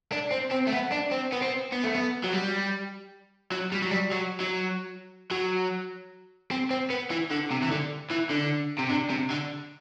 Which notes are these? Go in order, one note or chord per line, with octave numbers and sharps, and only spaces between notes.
D4
C4
C4
A3
B3
D4
C4
B3
C4
B3
A3
B3
F#3
G3
F#3
G3
F#3
G3
F#3
F#3
F#3
C4
C4
B3
E3
D3
C3
E3
D3
E3
D3
C3
D3
C3
D3